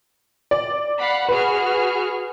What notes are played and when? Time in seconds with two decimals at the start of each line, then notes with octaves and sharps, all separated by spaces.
0.51 D5
0.98 F5 F#5 B5
1.29 F#4 G#4 B4 F6